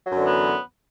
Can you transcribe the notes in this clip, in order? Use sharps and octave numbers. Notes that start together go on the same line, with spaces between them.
F#2 D3 E3 F#3 B3